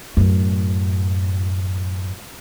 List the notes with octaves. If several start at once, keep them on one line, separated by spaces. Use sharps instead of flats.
F#2 A2